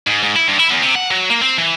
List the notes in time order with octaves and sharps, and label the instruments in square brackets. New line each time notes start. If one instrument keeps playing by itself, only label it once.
[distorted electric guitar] G#2
G#2
E4
G2
E4
E2
C3
F#5
F#3
A#3
C4
E3